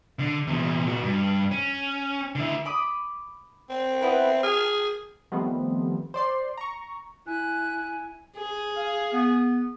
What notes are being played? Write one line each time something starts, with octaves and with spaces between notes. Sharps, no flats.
D3
E2 A#2
A#2 F#4
G2
C#4
D3 E4
B5 D6 D#6
C4
B3 E4 B4
G#4 F6
D#3 F3 G3 A3 B3 C4
C5 D5 C6
A#5 C#6
E4 G#5 F#6
G#4
F5
B3